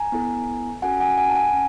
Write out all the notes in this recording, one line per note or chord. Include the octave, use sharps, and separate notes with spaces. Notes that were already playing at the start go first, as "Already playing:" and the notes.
Already playing: G#5 A#5
B3 E4 A4
C#4 F#4 A4 F#5 G#5
F#5 G#5
F#5 G#5
A5
F#5 G#5
C#4